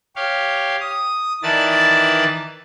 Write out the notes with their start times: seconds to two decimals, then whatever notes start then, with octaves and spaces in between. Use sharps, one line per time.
0.16 G4 C#5 F5
0.80 D#6
1.43 D#3 E3 B4 D5 A5 A6